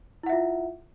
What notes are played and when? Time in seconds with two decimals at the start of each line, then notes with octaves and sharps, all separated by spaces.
0.23 E4
0.26 F#5
0.29 E5
0.32 F4